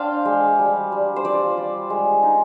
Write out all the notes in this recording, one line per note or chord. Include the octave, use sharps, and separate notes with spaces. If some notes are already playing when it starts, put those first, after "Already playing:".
Already playing: D4 C5 D5 F5 G5
G#3
G3
G3
C5
F4 D5
G3
G#3
D#4